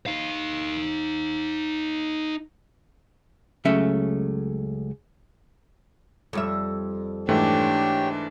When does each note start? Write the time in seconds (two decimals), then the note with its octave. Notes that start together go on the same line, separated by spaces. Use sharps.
0.06 D#4 F5
3.65 C#2 F#3 A3 C#4 E5
6.33 F2 G3 E5
7.29 G#2 E3 A3 D4 G4 C#5 G5